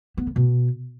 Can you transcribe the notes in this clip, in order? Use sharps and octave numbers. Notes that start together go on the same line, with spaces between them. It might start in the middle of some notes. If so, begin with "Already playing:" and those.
B3
D3
B2